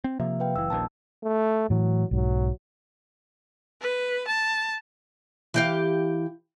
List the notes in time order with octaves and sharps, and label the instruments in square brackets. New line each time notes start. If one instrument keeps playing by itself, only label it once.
[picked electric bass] C4
[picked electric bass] C3 F3 A#3 [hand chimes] E5
[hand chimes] B4 F5 G5
[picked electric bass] F#1 E3 [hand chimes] E6
[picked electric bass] D#1 A#1 D#2 [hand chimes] A5
[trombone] A3
[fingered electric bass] A2 E3 [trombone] F#3
[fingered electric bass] B1 G#2 [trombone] F#3
[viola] B4
A5
[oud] E3 G4 F5